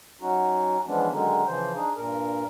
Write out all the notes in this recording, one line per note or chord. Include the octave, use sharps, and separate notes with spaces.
F#3 C#4 D#4 F#4
E3 F3 G#3 B3 C#4 D4
D3 D#3 F#3 G#3 C#4 D#4
C#3 E3 F3 C5
D4 D#4 G#4
G2 A#2 A#4